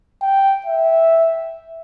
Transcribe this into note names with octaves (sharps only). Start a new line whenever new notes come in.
G5
E5